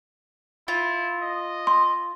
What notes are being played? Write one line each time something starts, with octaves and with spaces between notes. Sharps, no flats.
E4 F4
D#5
C6